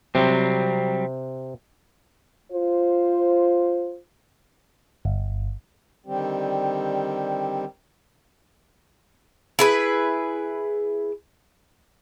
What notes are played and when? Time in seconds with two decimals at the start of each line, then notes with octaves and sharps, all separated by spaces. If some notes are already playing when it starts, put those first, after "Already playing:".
0.15 C3 F#3 G3 C4
2.51 F4 C5
5.05 G1
6.06 D3 D#3 G3 C4 G4
9.59 E4 G#4 B4